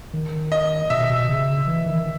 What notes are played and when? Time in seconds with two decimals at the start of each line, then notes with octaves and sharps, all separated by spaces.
0.13 D#3
0.52 D#5
0.90 B2 E5
1.10 B2
1.29 C#3
1.67 E3
1.86 D#3